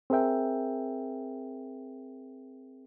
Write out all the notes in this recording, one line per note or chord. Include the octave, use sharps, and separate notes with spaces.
C4 G#4 A#4 E5 G5